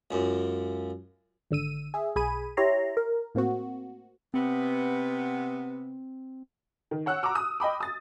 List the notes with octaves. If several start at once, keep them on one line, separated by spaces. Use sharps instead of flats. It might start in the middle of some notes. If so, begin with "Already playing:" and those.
C#2 F#2
G#1 D3 E6 D#7
G#4 E5
B1 G#4 G#5 B5 D#7
E4 G4 C#5 A#5 C6
A#4
A2 A#3 C4 F#4
C3 B3 C4
D#3
C#5 F#5 E6 F#6
A#5 C#6 D6 E6
D#6
D#5 G5 B5 D6
D#6 A6